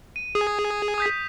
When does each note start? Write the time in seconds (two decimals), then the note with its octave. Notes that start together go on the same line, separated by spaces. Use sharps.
0.16 D#7
0.35 G#4 D#6
0.98 D#6 G6 B6